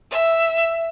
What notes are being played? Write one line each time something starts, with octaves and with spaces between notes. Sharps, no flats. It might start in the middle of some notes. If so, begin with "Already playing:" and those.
E5